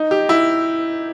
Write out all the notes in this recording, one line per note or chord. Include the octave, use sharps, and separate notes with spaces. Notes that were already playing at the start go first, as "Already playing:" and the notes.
Already playing: D#4
G4
E4